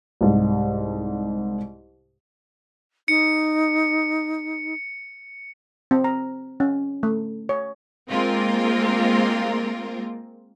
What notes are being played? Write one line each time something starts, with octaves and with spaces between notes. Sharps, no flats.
C2 G#2
D#4 C#7
C4
A#5
C#4
A3
C#5
G#3 A#3 C4 F4 A#4